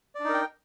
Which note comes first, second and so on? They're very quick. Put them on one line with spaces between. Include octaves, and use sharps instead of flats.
D5 D4 D#4 A#4 G5